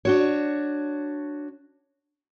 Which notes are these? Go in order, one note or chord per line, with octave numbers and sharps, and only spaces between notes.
D4 F#4 C#5